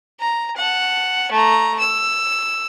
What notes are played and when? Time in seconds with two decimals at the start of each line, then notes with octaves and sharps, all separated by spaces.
0.20 A#5
0.57 F#5 A5
1.31 A3 A#5
1.80 E6